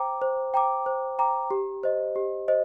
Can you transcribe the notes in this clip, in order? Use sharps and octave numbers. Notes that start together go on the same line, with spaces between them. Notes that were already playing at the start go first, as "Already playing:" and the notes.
Already playing: C5 G5 A#5 D6
C5
G5 A#5 D6
C5
G5 A#5 D6
G4
C5 D#5
G4
C5 D#5